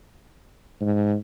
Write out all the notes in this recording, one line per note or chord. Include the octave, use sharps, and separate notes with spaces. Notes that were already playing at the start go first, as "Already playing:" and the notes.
G#2